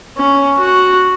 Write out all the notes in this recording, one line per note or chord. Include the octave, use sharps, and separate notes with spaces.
C#4
F#4